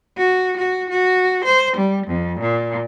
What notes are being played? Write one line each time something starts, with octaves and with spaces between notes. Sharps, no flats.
F#4
F#4
F#4
C5
G3
F2
A#2